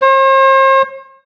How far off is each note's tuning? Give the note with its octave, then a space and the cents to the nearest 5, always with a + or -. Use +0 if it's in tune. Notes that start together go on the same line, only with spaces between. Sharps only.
C5 +45